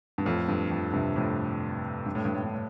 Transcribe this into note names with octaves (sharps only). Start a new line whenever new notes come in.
G2
F2 A2
G2
F2
G2 C3
F2 A2
G2
A2
G2
A2
G2
A2